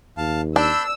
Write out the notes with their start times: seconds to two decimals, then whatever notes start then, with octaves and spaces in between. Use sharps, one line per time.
0.17 D#2 F5 A5
0.56 D4 B5 E6 G6